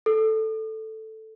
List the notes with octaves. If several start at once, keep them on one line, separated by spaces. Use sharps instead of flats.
A4